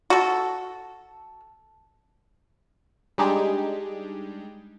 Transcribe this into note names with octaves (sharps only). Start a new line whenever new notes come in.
F#4 A4
G3 G#3 D4 D#4 G4 G#4